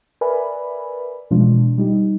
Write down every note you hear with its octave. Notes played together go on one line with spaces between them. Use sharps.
A#4 B4 D5 E5 G#5 B5
B2 E3 F3 G#3 D4 F4
G3 D#4 G4